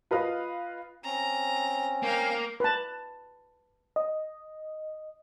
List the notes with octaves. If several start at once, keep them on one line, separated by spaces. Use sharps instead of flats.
F4 B4 D#5 F5
C4 C#4 A#5
A#3 F5 G5
B4 A5
D#5